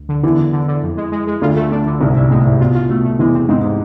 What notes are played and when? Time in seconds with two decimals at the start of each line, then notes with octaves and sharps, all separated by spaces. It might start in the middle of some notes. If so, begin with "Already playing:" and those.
Already playing: D2
0.09 D3
0.23 E2 D3 E3
0.38 D3
0.53 D3
0.68 D3
0.83 F2
0.97 G#3
1.12 G#3
1.27 G#3
1.41 D2 D3 F4
1.56 A3
1.71 D2 D3 D4
1.86 D3
2.01 C2 G#2 C3
2.16 E4
2.31 A2 G#3
2.45 G#2
2.60 B2 F4
2.75 F4
2.90 B2 A3
3.04 A3
3.19 E2 E3 G#3
3.34 C4
3.49 G#2 G#3 C4
3.63 C3